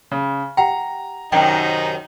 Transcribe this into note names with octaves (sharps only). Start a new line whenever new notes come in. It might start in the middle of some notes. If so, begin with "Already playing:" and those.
C#3
G4 F#5 G5 A#5
F#2 C3 D#3 D#4 G5 A5